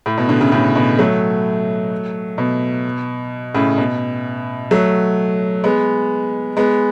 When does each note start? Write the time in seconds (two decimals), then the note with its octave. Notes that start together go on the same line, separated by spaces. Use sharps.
0.06 A2
0.18 B2
0.29 B2 D3
0.40 A2 C#3
0.52 A2 C#3
0.76 B2
0.99 F#3 A3
2.38 B2
3.54 A2 C#3
3.78 B2
4.71 F#3 A3
5.64 G#3 B3
6.57 G#3 B3